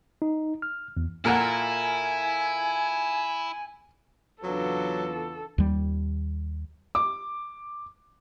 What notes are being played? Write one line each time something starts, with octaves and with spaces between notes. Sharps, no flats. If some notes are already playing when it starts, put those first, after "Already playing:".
D#4
F6
E2
A#2 E4 F4 A4 A#4 F#5 G#5
E2 C#3 F#3 D4 F4 F#4 A4 B4
D#2 G3
D6